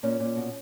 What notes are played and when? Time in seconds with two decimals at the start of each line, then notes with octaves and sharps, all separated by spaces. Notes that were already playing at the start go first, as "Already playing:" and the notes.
0.03 A#2 C#4
0.20 A#2
0.36 B2